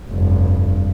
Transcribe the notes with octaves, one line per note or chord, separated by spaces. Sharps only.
F1 G2